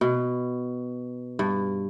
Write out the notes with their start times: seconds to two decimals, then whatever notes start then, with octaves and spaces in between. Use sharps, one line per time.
0.01 B2
1.39 G2